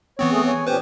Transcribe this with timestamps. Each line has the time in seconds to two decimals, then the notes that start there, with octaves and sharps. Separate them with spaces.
0.19 E3 B3 C4 C#5
0.31 A3 G#4
0.47 C#5 G#5
0.67 A#2 C#4 G4 B4 C5